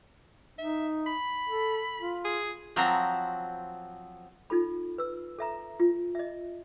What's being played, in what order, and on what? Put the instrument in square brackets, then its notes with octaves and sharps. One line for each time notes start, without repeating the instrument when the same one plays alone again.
[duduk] D#4 [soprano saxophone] E5
[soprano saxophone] B5
[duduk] A4
F4
[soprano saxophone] G#4
[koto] F3 F#3 C4 A#5
[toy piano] D#4 F4 A4 B5
B4 E6
A4 E5 A#5
F4
D#5 E5